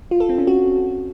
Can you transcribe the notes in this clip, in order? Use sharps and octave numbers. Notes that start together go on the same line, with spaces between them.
F4
A4
C4
C#4
F#4